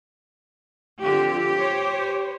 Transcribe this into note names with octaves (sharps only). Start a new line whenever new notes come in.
D3 F3 C4 G4
C5 C#5